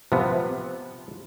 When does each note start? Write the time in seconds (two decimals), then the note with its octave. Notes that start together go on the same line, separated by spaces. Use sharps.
0.12 C3 F3 B3